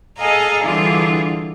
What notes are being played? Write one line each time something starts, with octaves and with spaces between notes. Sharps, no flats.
G#4 A4 D#5 F5 G#5 A#5
D3 E3 G3 D4 F4 G#4